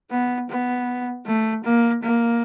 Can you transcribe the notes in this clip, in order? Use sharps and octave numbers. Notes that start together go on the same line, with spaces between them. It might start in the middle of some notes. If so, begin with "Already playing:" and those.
B3
B3
A3
A#3
A#3